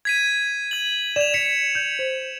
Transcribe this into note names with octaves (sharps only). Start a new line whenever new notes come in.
G#6 B6 D#7
G#6 F#7
D5 E7 F7
B6 C#7
G6
C5